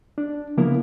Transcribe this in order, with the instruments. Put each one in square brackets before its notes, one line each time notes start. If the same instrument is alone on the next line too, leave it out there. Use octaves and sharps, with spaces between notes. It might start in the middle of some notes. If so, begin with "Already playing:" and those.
[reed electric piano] D4
C#3 F3 A#3 B3 E4 A#4